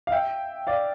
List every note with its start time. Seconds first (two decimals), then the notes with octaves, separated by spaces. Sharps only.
0.07 F5
0.12 E5 G5
0.67 D5 F5